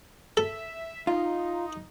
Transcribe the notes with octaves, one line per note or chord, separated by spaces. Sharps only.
A4 E5
D#4 F4